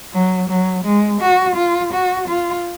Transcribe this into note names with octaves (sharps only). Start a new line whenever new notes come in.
F#3
F#3
G#3
F#4
F4
F#4
F4